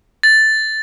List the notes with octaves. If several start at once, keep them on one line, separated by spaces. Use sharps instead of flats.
A6